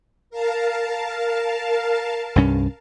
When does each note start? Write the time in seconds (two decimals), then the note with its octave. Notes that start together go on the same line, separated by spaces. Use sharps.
0.30 A#4 F5 A5
2.36 C2 G2 C#4